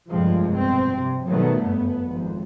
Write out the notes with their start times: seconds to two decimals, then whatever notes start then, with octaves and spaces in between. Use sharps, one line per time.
0.10 F1 A#1 G2 F3 G#3 C4
0.51 G2 B2 C4
0.98 C3
1.28 B2 D#3 F#3 G3 A3 B3
1.61 G1 F#2 B3
2.09 G#1 F2